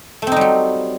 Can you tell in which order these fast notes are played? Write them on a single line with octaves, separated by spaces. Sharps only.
A3 C4 D#4 G3 F#3